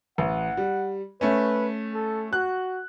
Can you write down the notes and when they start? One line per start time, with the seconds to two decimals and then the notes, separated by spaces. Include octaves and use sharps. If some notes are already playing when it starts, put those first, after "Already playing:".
0.18 A1 F#5
0.57 G3
1.21 A3 C#4 B4
1.94 A4
2.33 F#4 F#6